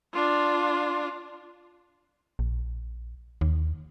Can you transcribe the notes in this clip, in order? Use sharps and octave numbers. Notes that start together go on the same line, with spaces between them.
D4 F4
A#1
D#2